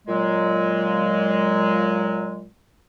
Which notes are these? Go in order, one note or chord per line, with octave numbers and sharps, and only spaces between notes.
A#2 F#3 G#3